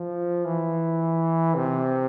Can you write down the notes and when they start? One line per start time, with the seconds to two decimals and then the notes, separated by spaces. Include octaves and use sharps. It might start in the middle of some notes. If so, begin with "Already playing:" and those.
Already playing: F3
0.45 E3
1.55 C3